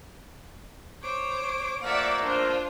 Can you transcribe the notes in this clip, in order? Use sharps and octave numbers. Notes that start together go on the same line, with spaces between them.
C5 C#5 D6
F3 A3 A#3 D5 E5 F#5
D4 F4 C5